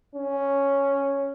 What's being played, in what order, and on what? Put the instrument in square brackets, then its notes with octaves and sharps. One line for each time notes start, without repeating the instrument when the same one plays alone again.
[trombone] C#4